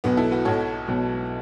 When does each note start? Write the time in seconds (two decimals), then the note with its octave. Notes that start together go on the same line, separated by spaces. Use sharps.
0.04 B1 B2 F#3 B3
0.17 E4 A4
0.31 F#4 B4
0.45 B1 B2 F#3 A4 C#5
0.88 B1 B2 F#3